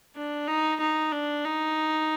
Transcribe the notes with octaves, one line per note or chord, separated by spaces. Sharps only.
D4
D#4
D#4
D4
D#4